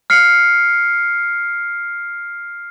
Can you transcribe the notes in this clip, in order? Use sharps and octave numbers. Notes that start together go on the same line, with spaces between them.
F6 C7 C#7